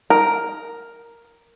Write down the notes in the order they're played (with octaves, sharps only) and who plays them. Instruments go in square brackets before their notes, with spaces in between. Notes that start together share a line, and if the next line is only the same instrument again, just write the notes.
[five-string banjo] A#4